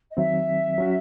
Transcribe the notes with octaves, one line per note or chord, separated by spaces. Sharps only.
D#5
D#3 F#3 C4 E5
F#3 C#4 F#4